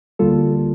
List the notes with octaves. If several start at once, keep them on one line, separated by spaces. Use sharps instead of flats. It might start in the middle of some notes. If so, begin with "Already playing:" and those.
D2 D3 G3 A#3 F4 A4